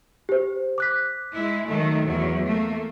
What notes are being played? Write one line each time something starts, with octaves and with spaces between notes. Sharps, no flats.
G4 C5
D6 F#6 B6
G#3 E4
D#3 F#3 A3
E2 F#3
A3 A#3